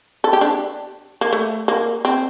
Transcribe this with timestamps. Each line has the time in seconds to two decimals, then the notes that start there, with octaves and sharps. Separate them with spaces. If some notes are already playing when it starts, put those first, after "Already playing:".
0.24 A4
0.33 G4
0.41 D4
1.21 A#3
1.33 A3
1.68 A#3
2.05 C4